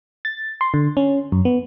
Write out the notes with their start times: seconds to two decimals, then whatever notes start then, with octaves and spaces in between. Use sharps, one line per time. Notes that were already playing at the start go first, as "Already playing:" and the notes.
0.25 A6
0.61 C6
0.74 D3
0.97 C#4
1.32 F#2
1.45 B3